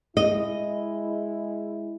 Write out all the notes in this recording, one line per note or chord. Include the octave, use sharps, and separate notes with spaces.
G#3 E4 D#5